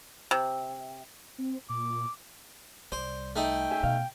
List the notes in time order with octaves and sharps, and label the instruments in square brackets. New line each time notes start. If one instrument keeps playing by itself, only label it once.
[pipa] C3
[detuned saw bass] C4
[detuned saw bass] A#2 [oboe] D6
[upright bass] C2 G3 [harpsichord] C5 [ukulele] D5
[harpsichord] A3 D#4 [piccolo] G5
[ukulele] C#4 G#4 E5
[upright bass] B2 [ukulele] F5